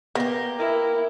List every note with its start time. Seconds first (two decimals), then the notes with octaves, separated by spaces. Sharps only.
0.15 A#3 B3 G4
0.59 E4 A#4